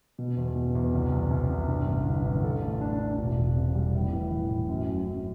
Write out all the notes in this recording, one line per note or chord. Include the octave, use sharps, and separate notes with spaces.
B2
E2
B2
E2
C2
C2
C2
C2
G2
A1
D3
A1
A4
A3
D4
D4
E1
E1
C3
G3
A2
E3
E3
A2
F#2
F#2
F#2